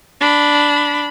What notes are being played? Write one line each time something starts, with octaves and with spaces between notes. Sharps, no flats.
D4 B5